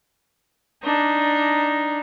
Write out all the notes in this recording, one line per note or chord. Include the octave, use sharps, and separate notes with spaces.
D4 D#4